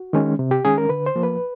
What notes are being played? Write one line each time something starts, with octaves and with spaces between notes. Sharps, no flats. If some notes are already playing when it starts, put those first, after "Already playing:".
Already playing: F#4
D#3 G#3 C#4
C3
G4
D#3 G#3 C#4 G#4
A#4
D3 B4
C5
F3 A#3
B4